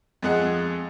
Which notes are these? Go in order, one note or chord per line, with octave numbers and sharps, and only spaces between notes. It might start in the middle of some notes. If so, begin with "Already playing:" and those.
F2 G#3 G#4 F#5